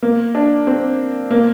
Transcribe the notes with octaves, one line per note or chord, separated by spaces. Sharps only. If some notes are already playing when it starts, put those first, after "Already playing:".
A#3
D4
C4
A#3